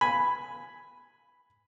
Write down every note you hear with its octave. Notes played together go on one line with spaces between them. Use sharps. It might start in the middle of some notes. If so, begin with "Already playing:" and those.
G#5 B5